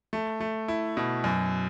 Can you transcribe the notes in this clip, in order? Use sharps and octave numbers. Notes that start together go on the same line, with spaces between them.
A3
A3
E4
B2
F#2